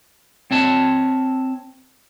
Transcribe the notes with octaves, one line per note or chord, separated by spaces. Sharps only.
C4 C#5 A5